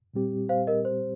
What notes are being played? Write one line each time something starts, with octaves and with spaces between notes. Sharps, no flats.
A#2 G3 C4 G4
C5 F5
A#4 D#5
C5